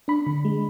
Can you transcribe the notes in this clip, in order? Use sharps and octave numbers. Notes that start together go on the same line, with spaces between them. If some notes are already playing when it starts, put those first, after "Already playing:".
D4 B5
D3
G#3